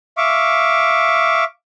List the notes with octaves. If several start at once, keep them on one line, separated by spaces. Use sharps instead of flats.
E5 F5 C#6 D6